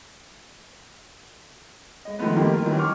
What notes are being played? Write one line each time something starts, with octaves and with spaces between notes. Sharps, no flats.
G#3 D#5
D#3 F3 G#3 A3 B3 B4
D#3 F3 G3 A3 A#3 G4
F4 A#4
D#3 E3 F#3 G3 C#4 D#4
C#6 D6 F6